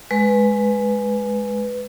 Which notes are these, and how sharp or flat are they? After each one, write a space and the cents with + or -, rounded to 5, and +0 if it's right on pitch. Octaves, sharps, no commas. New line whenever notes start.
G#3 +10 B4 +0